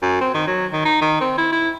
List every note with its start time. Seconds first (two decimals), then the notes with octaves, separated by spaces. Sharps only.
0.02 F#2
0.21 C4
0.35 D#3
0.47 F#3
0.73 D#3
0.85 D#4
1.01 D#3
1.21 C4
1.38 E4
1.52 E4